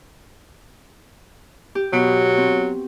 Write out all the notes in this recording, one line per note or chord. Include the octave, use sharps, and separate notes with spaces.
G4
B2 F#3
C4